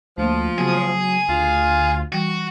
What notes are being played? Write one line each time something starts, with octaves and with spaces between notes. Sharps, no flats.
D2 F3 A3 A#3
C#3 F#3 B3 G#4
D2 F4
E3 G3 F#4 G5